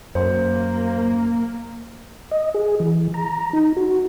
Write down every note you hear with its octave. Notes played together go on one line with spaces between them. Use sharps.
F#2 A#3 C5
D#5
G#4
E3
A#5
D#4
F#4